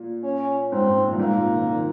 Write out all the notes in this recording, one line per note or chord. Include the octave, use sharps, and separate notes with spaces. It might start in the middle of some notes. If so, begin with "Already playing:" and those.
Already playing: A#2
C#4
G#2 C4
G#2
A#2
G2
G#2 A#3
A#2
C3
D#3
D#3